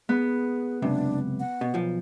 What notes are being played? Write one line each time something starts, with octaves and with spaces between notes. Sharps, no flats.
B3 G#4
C#2 F#2 C3 D4
F#5
B2
B1 F3